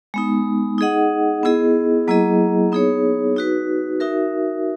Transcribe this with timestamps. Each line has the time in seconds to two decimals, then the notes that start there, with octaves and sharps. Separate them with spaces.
0.14 G#3 B3 D#4
0.78 D#4 G#4 D#5 F#5
1.43 B3 E4 G#4 D#5
2.08 F#3 A#3 E4 G#4 D#5
2.72 B3 D#4 G#4 C#5
3.36 D#4 F#4 B4
4.00 D#4 F#4 A#4 E5